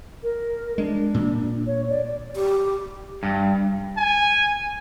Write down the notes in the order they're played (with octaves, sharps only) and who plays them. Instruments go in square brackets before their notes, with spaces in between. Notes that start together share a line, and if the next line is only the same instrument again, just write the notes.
[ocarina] A#4
[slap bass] G#3 [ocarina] D4
[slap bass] A#2
[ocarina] C#5
D5
[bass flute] G4
[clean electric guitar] G2
[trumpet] G#5